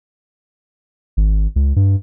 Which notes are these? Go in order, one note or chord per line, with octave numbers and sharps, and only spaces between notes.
G#1
C#2
G2